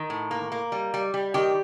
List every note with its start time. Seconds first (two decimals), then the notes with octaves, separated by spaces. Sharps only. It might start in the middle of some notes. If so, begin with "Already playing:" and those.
Already playing: D#3
0.10 A2
0.31 A#3
0.52 A#3
0.72 G3
0.94 G3
1.14 G3
1.34 D#3 G4